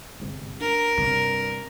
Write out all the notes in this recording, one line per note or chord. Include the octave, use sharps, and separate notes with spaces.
G1 G#2 C3
D4 A#4
G2 C3